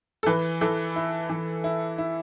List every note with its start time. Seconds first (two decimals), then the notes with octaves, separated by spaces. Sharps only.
0.23 A4
0.26 E3 B4
0.61 E3 A4
0.96 E4
1.29 E3
1.64 E4
1.98 E4